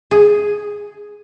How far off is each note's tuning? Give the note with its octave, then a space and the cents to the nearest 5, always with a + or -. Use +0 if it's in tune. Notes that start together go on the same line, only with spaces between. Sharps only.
G#4 +0